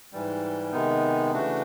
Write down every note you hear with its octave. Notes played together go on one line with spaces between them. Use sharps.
G#2 E3 G3
C3 D#3 G#3 B3 D#4
C#3 E3 A3 D4 F#4